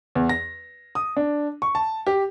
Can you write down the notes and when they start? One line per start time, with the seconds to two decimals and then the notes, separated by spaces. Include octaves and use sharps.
0.15 E2
0.29 A#6
0.95 D#6
1.17 D4
1.62 C#6
1.75 A5
2.07 G4